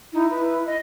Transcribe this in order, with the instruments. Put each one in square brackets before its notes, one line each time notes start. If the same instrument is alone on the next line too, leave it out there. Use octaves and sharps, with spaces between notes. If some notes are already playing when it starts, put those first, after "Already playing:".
[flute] D#4 [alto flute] E4
[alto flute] E4 [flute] B4
[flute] D#5